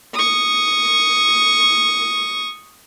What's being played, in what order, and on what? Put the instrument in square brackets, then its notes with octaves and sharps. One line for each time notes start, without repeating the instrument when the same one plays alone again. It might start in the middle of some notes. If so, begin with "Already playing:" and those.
[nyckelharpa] C#6 D#6